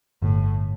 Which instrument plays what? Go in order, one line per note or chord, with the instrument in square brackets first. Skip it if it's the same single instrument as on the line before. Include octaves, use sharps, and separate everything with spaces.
[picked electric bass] G1 [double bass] A2